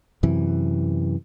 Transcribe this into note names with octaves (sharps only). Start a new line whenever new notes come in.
F#2 C3 E3